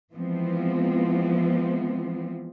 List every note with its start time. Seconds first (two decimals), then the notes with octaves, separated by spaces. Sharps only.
0.14 E3 F3 G#3 B3 C4